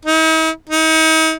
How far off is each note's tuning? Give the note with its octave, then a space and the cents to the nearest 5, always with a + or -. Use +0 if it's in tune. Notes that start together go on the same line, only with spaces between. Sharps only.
D#4 +45
D#4 +40